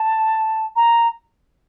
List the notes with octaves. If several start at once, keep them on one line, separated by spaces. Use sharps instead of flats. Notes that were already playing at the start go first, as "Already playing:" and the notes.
Already playing: A5
A#5